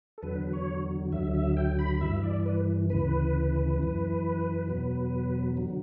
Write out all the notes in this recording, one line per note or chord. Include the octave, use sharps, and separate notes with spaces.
A4
E2 D3 F#3 B4
C#5
D2 D3 F#3 E5
E5
G5
B5
G2 E3 E5
D5
B4
D2 C#3 E3 B4
F#2 E3
E2 B2 F#3
D3 F#3